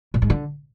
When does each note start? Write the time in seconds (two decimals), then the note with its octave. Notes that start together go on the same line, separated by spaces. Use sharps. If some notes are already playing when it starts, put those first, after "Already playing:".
0.14 A2
0.22 G#2
0.30 D3